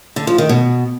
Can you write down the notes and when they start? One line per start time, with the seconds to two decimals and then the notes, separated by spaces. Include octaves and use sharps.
0.16 D3
0.27 F3
0.38 D#3
0.49 B2